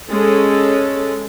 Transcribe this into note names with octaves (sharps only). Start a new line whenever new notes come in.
G#3 C#4 A4